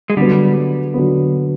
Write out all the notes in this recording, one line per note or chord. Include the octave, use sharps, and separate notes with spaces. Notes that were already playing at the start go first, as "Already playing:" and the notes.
G#3
D3 F#3 G3 B3
D3 F#3 B3